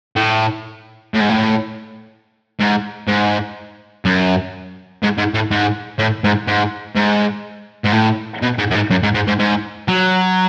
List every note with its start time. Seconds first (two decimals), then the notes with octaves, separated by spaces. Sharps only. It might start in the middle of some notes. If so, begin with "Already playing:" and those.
0.16 A2
1.14 A2
1.21 G#2
1.29 A2
2.60 G#2
3.07 G#2
4.05 F#2
5.03 G#2
5.18 G#2
5.34 A2
5.51 G#2
5.99 A2
6.24 G#2
6.48 G#2
6.96 G#2
7.85 G#2
7.93 A2
8.42 B2
8.58 G#2
8.71 F#2
8.75 G#2
8.90 F#2
9.03 G#2
9.15 G#2
9.28 G#2
9.39 G#2
9.88 F#3